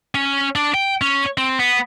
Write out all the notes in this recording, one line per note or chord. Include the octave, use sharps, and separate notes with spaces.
C#4
D4
G5
C#4
C4
B3